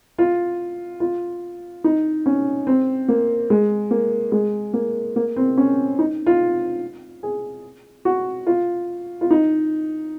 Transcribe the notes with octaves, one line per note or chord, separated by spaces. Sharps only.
F4
F4
D#4
C#4
C4
A#3
G#3
A#3
G#3
A#3
A#3
C4
C#4
D#4
F4
G#4
F#4
F4
F4
D#4